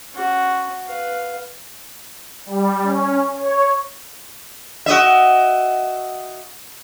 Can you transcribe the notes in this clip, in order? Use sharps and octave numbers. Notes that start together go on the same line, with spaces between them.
C#4 F#4
B4 F5
G3
C#4
C#5
F#4 D#5 E5